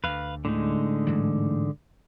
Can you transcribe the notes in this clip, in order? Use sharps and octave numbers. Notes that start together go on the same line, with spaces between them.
D2 B4 F5
A2 D3 G#3 D#4
G#2 E3 F#3